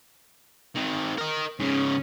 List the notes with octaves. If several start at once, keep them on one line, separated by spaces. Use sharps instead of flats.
D#3 C4
A#4 D#5
G#2 C#3 C#4